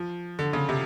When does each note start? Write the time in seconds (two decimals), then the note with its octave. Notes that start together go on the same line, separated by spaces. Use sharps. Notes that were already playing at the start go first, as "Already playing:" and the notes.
Already playing: F3
0.39 D3
0.53 C#3
0.69 C3